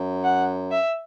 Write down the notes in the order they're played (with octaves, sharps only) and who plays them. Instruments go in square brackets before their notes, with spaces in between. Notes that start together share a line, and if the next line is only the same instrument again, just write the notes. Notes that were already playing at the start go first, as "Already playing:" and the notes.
Already playing: [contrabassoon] F#2
[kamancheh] F#5
E5